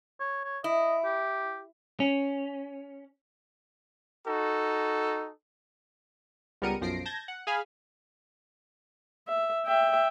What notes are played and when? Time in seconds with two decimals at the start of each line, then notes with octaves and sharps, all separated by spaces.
0.20 C#5
0.44 C#5
0.64 E4 D#5
1.05 G4
2.00 C#4
4.27 D#4 F#4 A4
6.62 C#2 G3 B3 A#4 C#7 D#7
6.81 B1 F#2 F3 A#6 C7 D7
7.05 A5 G6 G#6 A#6
7.28 F#5
7.47 G#4 F5 G#5 B5 F6
9.28 E5
9.66 E5 G5